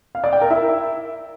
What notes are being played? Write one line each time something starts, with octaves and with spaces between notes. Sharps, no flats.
F5
D5
G5
A#4
E4